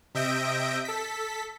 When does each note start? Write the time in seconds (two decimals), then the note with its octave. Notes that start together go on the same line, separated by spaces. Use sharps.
0.15 C3 D#5 E5 G6 A#6 D7
0.85 A4 B6